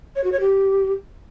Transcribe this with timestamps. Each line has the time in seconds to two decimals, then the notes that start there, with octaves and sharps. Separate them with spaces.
0.15 C#5
0.23 F#4
0.32 C#5
0.40 G4